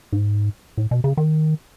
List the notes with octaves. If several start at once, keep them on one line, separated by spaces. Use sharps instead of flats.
G#2
A2
B2
C#3
D#3